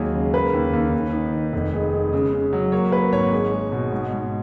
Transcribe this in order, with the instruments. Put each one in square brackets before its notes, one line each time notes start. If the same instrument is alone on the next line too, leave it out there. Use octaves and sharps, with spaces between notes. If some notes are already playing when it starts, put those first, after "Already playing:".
Already playing: [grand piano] D#2 F#3 G#3 G#4
C#3
A#3 B4
D#2
D#2
D#2
D#3
D#3
F1
G#3
G#3
C#3
C#3
F#3
A#3 C#5
A#3 B4
G#1 C#5
G#3
G#3
B2
G#2
G#2